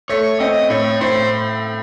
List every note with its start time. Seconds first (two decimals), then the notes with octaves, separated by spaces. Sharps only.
0.09 A3 C#5
0.40 C4 D#5
0.70 A2 C#5
1.01 A2 C5